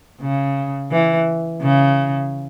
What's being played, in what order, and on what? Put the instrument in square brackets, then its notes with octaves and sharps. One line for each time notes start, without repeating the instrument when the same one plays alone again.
[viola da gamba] C#3
E3
C#3